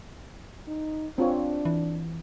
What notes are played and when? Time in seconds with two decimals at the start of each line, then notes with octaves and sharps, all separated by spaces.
0.68 D#4
1.18 C4 D4 F4 C#5
1.65 E3